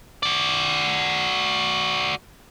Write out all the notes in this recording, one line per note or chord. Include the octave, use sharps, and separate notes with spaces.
F#4 D5